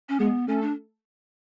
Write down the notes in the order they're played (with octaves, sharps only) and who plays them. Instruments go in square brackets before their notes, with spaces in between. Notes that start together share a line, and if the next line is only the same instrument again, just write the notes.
[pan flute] C#4
[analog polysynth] G#3 G#4 [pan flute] B3
[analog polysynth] A3 A4 [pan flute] C#4
[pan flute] D4